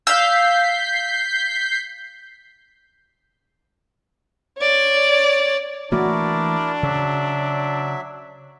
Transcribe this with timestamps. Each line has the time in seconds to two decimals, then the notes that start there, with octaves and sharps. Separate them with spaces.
0.07 F5 E6 G6 B6 C7
4.58 C#5 D5
5.92 E3 A3 A#3 D4 E4 F#4 A#4 D5
6.83 C#3 F#3 E5